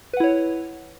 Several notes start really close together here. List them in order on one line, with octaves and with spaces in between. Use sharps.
B4 F#5 E4 C#5